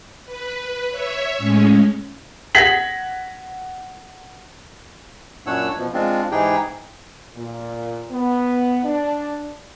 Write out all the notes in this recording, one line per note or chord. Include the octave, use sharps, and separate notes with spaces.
B4
C#5 E5
A2 G#3 C#4
F#5 G#6 A#6 B6 F#7
F#2 A#2 D4 C#5 F#5 E6
B2 F3
G#3 C4 D4 F4
G#2 E3 D#4 G4 G#4 G5
A#2
B3
D4